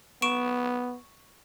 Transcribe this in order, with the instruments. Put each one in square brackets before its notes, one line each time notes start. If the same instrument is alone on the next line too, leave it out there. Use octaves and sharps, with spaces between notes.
[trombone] B3 [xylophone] C#6 D7 E7